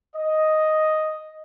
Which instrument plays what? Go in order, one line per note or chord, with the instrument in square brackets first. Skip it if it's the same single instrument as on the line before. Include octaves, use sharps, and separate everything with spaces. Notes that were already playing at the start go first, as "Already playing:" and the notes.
[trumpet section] D#5